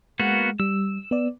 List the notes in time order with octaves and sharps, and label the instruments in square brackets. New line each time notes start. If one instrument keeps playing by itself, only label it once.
[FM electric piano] G#3 [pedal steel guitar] A#3 B3 F#4
[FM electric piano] G3 [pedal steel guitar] E6
[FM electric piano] B3 D5